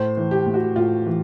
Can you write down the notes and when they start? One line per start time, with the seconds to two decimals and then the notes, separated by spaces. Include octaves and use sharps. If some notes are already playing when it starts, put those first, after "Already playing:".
Already playing: A2 C5
0.17 E3
0.31 G4
0.46 A2
0.54 F#4
0.76 A2 F4
1.06 E3